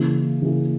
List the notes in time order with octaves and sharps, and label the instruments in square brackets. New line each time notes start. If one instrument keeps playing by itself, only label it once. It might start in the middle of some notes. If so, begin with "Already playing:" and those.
Already playing: [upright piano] C#3 E3 A#3 E4 G#4
C#3 E3 A#3 E4 G#4